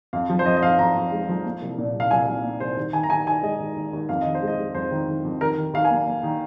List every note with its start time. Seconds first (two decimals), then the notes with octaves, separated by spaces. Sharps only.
0.13 F2 F5
0.30 F3
0.39 C5
0.46 F2 D#5
0.57 D#5
0.63 F2 F5
0.79 F2 A#5
0.95 F2
1.12 G#3
1.29 F3
1.45 A#3
1.62 C2
1.78 A#2
1.94 C2
2.00 F5
2.11 C2 G#5
2.28 C2 F5
2.44 A#3
2.60 C2 C5
2.77 D#2
2.93 D#3 G#5
3.03 A#5
3.10 D#2 G#5
3.26 D#2 G#5
3.43 G#3 D#5
3.60 D#2
3.76 D#2
3.93 D#2
4.09 F2 F5
4.21 D#3 D#5
4.35 C5
4.42 G#3
4.47 D#5
4.59 G#3
4.75 F2 C5
4.91 D#3
5.08 D#3
5.24 F2
5.41 D#2 A#4
5.57 D#3
5.73 D#2 F5
5.85 G#5
5.90 A#3
6.07 A#3
6.23 D#3